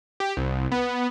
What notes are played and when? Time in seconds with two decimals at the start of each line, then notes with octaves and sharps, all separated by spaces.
0.20 G4
0.37 C2
0.72 B3